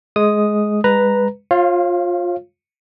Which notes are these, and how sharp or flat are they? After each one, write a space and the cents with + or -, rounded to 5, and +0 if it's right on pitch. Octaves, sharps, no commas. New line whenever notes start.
G#3 +15 D#6 +0
G#3 -40 B4 +0 A#5 +0
F4 +20 C#5 -40 F5 -15